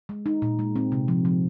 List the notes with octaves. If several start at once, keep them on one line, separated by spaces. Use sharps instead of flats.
G#3
D#4
A#2
G#3
C4
C3
F3
F3